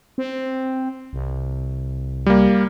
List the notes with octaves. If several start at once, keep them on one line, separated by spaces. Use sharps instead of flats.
C4
C2
G3 A#3